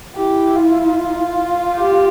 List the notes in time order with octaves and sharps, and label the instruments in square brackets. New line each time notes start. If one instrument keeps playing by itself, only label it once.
[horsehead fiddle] E4 [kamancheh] G4
[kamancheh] F4
[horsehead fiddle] G4